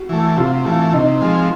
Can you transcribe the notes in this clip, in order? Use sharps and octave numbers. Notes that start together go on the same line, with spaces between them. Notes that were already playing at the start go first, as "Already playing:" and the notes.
Already playing: F#4
E3 A3
C3 F4
E3 A3 F4
C3 D#4
F3 G#3 C4